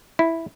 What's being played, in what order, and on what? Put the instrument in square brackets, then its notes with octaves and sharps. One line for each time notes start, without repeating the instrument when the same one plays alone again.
[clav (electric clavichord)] E4